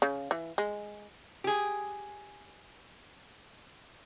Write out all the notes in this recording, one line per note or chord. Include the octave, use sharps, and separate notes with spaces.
C#3
E3
G#3
G4 G#4